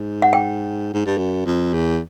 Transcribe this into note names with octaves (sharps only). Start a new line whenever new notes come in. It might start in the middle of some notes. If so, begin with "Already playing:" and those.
Already playing: G#2
F#5
G5
G#2
G2
F#2
F2
E2